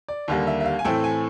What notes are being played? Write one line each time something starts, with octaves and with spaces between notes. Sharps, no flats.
D5
D#2 D3 G3 A#3
E5
E5
F5
G#5
A2 E3 A3 C4 G5
G#5